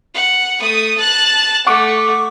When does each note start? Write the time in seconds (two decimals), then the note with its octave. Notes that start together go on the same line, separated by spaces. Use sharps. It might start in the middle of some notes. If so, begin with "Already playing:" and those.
0.14 F#5
0.60 A3 D#6
0.97 A5 F#6
1.67 A3 F#5 C#6 D6